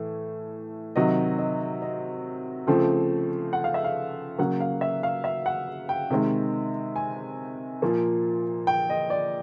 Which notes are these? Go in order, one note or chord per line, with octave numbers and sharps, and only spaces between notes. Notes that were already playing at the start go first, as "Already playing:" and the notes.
Already playing: A2 E3 A3
C3 D#3 F#3 D#5
D#5
D#5
C#3 F3 A3 C4
F#5
F5
E5
F5
C#3 F#3 A#3 F#5
F5
E5
F5
E5
F#5
G5
C3 D#3 G#3
G#5
A#2 F3 A#3
G5
D#5
D5